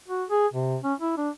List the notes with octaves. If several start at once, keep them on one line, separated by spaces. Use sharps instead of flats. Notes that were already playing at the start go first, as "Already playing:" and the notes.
F#4
G#4
C3
C#4
E4
D4